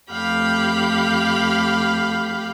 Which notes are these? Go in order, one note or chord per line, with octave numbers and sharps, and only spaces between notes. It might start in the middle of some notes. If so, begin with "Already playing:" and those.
F2 A3 G4 F5 B5 G6